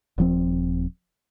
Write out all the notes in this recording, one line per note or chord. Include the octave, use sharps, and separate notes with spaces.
D#1 F3 C4